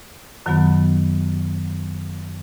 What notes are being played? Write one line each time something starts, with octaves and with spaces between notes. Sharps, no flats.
F#2 D#3 F#3 B3